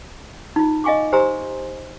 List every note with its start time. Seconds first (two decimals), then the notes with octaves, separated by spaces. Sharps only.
0.56 D#4 F4
0.84 D#5 F5 G#5 C#6 D6
1.12 G4 C5 G#5 A#5 C6 E6